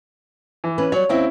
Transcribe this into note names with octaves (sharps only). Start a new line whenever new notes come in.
E3
B3 C#4 B4
F#3 G3 C#5
D#2 C4 C#4 E4 D#5